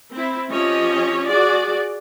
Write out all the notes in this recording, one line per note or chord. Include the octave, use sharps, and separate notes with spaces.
C4 E4
F3 C#4 G4 C#5 D#5
F#4 G#4 D5